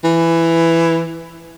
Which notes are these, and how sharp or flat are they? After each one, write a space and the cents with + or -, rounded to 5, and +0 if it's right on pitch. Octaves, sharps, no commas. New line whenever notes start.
E3 +10